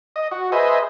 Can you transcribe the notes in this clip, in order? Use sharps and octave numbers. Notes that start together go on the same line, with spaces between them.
D#5
F#4
G#4 B4 C5 D#5 E5